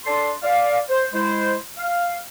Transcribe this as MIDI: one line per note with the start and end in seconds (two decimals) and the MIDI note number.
0.06 0.30 62
0.06 0.30 69
0.06 0.30 74
0.06 0.30 81
0.06 0.30 84
0.43 0.79 74
0.43 0.79 77
0.89 1.06 72
1.13 1.54 56
1.13 1.54 64
1.13 1.54 72
1.78 2.18 77